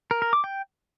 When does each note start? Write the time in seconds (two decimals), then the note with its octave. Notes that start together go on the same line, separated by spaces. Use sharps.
0.11 A#4
0.22 A#4
0.33 D6
0.44 G5